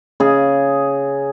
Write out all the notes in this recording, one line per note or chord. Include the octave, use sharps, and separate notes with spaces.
C#3 G#4